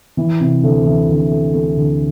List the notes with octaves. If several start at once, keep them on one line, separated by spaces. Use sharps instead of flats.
E3
C3
D2
E3
D2
A3
A3
D2